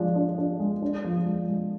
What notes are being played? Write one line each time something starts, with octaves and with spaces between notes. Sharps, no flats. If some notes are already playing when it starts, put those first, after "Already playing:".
Already playing: F3 G#3 D4
D4
D4
G#3
D4
F3
G#3
G#3